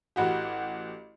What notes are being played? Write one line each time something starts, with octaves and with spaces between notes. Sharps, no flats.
A1 F#4 G4